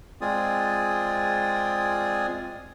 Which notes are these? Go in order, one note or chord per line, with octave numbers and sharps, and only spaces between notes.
G#3 C4 F4 G#4 D5 D#6